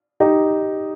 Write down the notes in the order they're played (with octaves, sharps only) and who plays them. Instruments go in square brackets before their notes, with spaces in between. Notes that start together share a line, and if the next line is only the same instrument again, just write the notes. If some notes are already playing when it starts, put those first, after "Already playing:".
[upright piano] D#4 G4